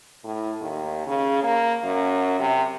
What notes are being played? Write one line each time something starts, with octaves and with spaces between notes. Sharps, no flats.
A2
D#2
C#3
A#3
F#2
C3